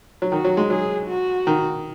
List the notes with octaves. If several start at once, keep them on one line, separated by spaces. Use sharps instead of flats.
F#3
D#3 F#4
F#3
G#3
F#3 G#4
F#4
D#3